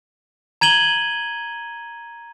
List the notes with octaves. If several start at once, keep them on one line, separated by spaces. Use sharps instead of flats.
A#5 G#6 D#7 F#7 G7